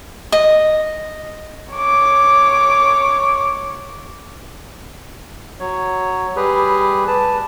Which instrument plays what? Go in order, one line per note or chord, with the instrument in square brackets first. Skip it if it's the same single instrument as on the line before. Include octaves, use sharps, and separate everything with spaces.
[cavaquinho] D#5
[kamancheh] C#5 D6
[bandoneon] F#3 C#5
G3 G4 G#4 B4
B4 A5